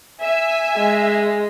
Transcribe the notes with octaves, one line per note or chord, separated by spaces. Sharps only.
E5 G#5
G#3